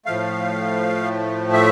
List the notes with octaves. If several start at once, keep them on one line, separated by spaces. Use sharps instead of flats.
A2 F3 A3 F5
E5